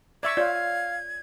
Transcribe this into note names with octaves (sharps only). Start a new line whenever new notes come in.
D5 E5 C#6 G#6
F4 C#5 D5 F5